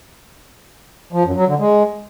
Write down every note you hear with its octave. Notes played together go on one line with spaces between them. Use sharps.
F3
F#2
F#3
D3
G#3